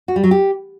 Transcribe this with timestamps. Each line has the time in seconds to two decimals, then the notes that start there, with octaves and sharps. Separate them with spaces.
0.08 F#4
0.16 G3
0.23 F#3
0.31 G4